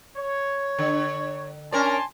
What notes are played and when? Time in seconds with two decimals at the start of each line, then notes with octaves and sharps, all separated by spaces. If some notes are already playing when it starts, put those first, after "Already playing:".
0.18 C#5
0.79 D3
1.72 C#4 A#4 D5 G#5 A5 C6